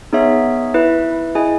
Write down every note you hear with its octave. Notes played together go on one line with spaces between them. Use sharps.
B3 D#4 G#4 C#5 E5
E4 B4 E5
E4 G#4 D#5 G#5